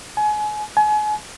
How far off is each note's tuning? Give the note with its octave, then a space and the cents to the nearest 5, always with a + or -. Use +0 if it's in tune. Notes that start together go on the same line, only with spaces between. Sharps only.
G#5 +30
G#5 +35